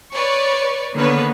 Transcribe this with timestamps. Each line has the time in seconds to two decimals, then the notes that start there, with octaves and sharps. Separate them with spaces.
0.14 B4 C#5 D5 C#6
0.96 D3 D#3 A#3 B3 B4 C#5